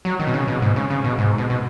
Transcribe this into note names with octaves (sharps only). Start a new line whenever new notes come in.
F#3
D#3
B2
C#3
B2
G#2
C#3
C#3
B2
G#2
B2
B2